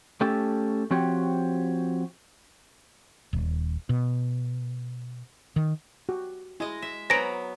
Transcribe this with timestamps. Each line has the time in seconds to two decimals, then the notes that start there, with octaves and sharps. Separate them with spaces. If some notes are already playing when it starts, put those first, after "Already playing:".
0.21 A3 C#4 G4 A4
0.91 F3 C4 F#4 G4 C#5
3.33 D#1
3.89 B2
5.56 D#3
6.09 F#4 G4
6.60 G#3 E4 D#5
6.82 E5
7.10 F#3 B3 C5 G#5 A#5 A#6 D7